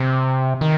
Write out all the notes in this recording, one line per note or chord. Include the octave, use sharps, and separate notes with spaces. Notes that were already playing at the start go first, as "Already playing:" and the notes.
Already playing: C3
D#3